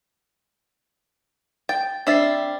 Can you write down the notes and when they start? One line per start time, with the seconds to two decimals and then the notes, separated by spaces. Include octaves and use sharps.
1.69 G5 A6
2.07 G3 C4 D4 E5 A6 C7